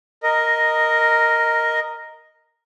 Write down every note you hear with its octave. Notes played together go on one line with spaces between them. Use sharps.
A#4 D#5